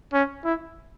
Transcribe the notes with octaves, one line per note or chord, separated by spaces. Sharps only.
C#4
E4